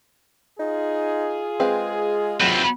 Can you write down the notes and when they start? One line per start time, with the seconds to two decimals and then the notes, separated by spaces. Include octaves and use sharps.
0.60 D#4 F4 G#4
1.60 G#3 C4 B4 F5
2.41 C3 D#3 F#3 C4 F4 B4